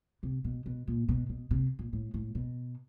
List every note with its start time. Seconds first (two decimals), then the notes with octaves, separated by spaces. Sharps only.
0.23 C3
0.44 B2
0.66 B2
0.88 A#2
1.09 B2
1.29 B2
1.51 C3
1.79 A#2
1.93 A2
2.14 A2
2.35 B2